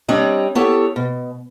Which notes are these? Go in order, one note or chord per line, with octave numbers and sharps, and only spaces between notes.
G3 C4 D4 C#5 D#5
B3 E4 G4 A4 C#5
B2